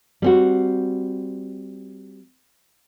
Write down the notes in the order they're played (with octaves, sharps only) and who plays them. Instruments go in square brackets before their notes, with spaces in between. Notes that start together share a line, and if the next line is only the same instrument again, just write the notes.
[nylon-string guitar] G3 C4 F#4